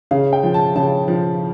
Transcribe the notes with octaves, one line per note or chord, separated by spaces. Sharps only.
C#3 F5
G5
F3
A5
C#3 A5
F3